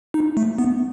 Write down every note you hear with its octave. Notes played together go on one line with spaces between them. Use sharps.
D#4
A3
B3